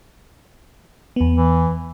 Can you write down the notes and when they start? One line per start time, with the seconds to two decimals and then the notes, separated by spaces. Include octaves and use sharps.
1.16 E2 B3
1.37 E3